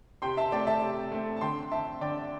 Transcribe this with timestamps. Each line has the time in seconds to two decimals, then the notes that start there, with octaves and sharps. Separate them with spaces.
0.22 C3 G5 C6
0.37 E5 A5
0.52 A3 C4 D5 G5
0.67 E5 A5
0.82 C3
1.12 A3 C4
1.36 A5
1.41 D3 G5 C6
1.72 C4 E5 A5
2.01 D3 D5 G5